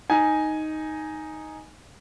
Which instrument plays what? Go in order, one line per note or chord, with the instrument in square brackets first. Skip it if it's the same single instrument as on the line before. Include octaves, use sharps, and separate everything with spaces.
[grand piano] D#4 G#5